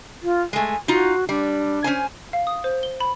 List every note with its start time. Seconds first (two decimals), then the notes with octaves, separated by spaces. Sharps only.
0.23 F4
0.53 G#3 A3 G#5
0.88 D#4 F4 F#4
1.29 G3 D4
1.84 C#4 C5 G#5
2.33 F5
2.47 D#6
2.64 C5
2.83 G7
3.01 B5